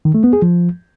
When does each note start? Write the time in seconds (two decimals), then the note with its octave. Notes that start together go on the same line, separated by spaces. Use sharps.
0.05 D#3
0.14 A3
0.24 B3
0.33 G#4
0.42 F3